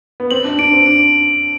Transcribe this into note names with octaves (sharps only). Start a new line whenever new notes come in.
B3
C4 F#7
D4
D4 D7
C4
D4 D7